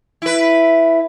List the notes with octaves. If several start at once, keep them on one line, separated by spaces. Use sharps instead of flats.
E4 B4